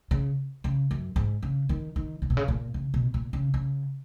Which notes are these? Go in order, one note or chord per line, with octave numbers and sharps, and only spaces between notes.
C#3
C#3
F#2
G#2
C#3
D#3
D#3
C#3
B2
C#3
A#2
C#3
B2
A#2
C#3
C#3